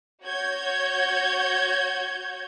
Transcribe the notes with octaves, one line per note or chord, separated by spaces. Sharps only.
F#4 C#5 G6 G#6